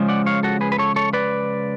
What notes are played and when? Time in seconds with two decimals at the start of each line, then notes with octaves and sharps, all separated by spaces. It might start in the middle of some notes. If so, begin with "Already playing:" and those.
Already playing: C#3 F3 G#3
0.08 D5 F#5
0.26 C#5 F5
0.43 F#4 A4
0.61 G#4 B4
0.72 B4
0.78 A4 C#5
0.96 A4 C#5
1.13 B4 D5